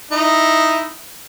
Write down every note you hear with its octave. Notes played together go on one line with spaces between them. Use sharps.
D#4 E4